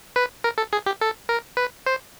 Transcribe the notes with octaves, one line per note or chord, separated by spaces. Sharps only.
B4
A#4
A4
G#4
G4
A4
A#4
B4
C5